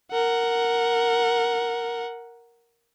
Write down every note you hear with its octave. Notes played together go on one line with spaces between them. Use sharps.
A#4 F#5